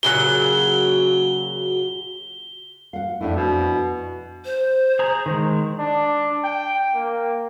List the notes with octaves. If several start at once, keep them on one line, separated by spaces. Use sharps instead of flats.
A#2 C#3 F#3 G7
F5 F#5
F2 A2 D4 E4
B2
C5
G#4 A#5
D#3 G#3
D4
G5
A#3